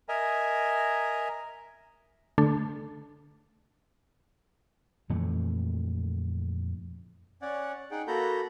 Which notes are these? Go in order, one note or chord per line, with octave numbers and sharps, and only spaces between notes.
A#4 D#5 E5 G#5 A#5
D3 A3 D4 A4
F2 A#2 E3 A3
C#4 C#5 D5 F#5
D#4 G#4 F#5 G5
A#3 F#4 A4 A#5 B5 G6